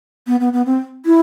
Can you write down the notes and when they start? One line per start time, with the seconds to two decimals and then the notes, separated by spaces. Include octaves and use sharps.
0.27 B3
0.40 B3
0.53 B3
0.66 C4
1.06 E4